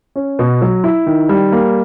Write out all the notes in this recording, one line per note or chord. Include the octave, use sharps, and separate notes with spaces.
C#4
B2
F#3
E4
D#3
G3
A#3